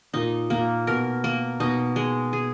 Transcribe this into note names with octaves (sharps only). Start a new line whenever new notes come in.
A#2 D#4
A#2 A#3
B2 A#4
A#3
B2 D#4
G#3
G#4